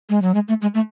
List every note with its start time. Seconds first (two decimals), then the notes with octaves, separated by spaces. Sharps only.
0.09 G#3
0.22 F#3
0.34 G#3
0.48 A3
0.62 G#3
0.74 A3